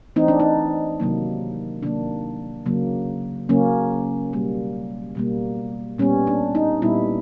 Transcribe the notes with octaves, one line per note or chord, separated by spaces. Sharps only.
E3 A3 C4 D#4
D4
D#4
C3 D#3 F#3 A#3
C3 D#3 F#3 A#3 D4
C#3 F#3 A#3
C#3 F#3 A#3 C#4
B2 G3 A#3
B2 G3 A#3
A#2 G3 B3 C#4
D4
D#4
A#2 G3 B3 E4